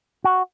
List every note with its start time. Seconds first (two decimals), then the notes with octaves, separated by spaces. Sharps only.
0.24 F#4